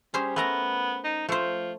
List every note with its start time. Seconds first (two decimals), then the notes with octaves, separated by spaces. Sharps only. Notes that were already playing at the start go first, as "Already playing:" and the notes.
0.14 G3 C#4 G#4 C5
0.36 A3 B3 A#4 A#5
1.04 D#4
1.29 F3 A3 C5